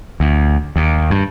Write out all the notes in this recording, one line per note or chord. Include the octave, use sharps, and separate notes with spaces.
D2
D#2
G2